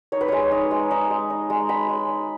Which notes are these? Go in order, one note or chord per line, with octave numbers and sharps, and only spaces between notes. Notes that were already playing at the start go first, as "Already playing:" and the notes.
D#4 C#5
B4
G#3 C#5
D#4
G#3
D#4
G#3
D#4
G#3
D#4 B5
G#3
D#4